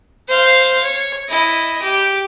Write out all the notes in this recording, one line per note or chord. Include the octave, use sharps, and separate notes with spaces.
C5 F5
C#5
E4 D#5
G4